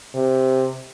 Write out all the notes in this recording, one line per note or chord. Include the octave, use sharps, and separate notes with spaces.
C3